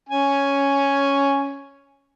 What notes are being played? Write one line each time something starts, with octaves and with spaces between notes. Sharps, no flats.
C#4 G#5